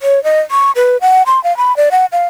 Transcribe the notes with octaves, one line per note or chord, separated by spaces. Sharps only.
C#5
D#5
C#6
B4
F#5
C6
F5
B5
D5
F#5
F5